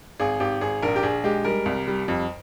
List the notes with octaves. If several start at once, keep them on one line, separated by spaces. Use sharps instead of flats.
G#1 G#4
G#1 G4
G#1 G#4
A#1 A#4
G4
A#1 G#4
G#3 G4
G3 A#4
C2
G3
F2